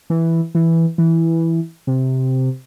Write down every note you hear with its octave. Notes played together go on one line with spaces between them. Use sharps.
E3
E3
E3
C3